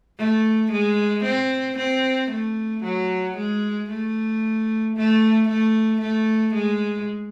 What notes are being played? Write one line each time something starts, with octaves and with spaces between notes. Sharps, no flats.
A3
G#3
C4
C4
A3
F#3
G#3
A3
A3
A3
A3
G#3